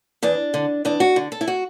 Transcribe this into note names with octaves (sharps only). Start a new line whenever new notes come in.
E2 D4
D3
E2 D4
F#4
D3
A4
E4
F#4